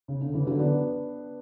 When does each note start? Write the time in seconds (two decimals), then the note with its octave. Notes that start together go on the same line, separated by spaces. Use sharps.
0.08 C#3
0.21 D3
0.34 C#3 E3
0.47 D3 F#3
0.59 B3 D4